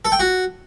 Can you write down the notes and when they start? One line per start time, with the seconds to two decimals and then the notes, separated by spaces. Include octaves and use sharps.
0.05 A4
0.12 G5
0.19 F#4